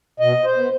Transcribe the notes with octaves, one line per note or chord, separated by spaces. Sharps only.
B2 D#5
C5
B3